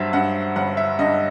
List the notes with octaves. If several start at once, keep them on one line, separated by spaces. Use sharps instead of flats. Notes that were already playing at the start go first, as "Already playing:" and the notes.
Already playing: G2 F#3 C5 E5
G2 F#5
G1 F#5
E5
G2 D#5